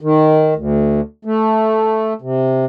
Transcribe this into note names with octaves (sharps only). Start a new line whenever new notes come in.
D#3
D2
A3
C3